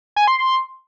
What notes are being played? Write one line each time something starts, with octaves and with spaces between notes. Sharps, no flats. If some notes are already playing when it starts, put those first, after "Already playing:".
G#5
C6
C6